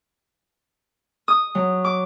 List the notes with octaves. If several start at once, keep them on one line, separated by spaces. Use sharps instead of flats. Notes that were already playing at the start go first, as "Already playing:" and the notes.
D#6
F#3
D6